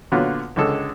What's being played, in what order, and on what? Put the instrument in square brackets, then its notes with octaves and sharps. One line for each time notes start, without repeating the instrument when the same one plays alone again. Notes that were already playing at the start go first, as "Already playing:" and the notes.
[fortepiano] A#2 D3 F#3 B3 F4 F#4
C#2 D3 G#3 A4